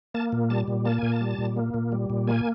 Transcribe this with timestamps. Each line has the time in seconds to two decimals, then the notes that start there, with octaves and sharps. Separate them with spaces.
0.14 A#3 A5
0.32 A#2
0.50 G3 A5
0.68 A#2
0.85 A#3 A5
0.98 A#2 G#5
1.12 A5
1.21 G3
1.38 A#2
1.57 A#3
1.74 A#2
1.92 G3
2.10 A#2
2.27 A#3 G#5